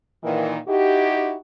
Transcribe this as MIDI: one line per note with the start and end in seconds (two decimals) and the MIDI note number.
0.23 0.57 46
0.23 0.57 51
0.23 0.57 52
0.68 1.35 63
0.68 1.35 64
0.68 1.35 66
0.68 1.35 67